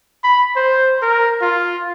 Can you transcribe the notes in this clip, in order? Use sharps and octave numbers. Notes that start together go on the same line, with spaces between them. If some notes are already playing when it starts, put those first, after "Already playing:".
B5
C5
A#4
F4